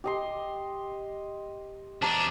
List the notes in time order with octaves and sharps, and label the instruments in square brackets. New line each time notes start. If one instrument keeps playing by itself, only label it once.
[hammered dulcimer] G4 D#5 C6
[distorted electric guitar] E2 D4 [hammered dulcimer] A5 A#5 D6